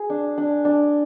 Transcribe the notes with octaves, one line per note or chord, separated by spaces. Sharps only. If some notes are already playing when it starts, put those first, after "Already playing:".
Already playing: G#4
D4
D4
D4